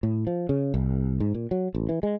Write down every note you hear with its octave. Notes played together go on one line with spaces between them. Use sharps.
A2
F3
C#3
C2
G#2
A#2
F#3
A1
E3
G#3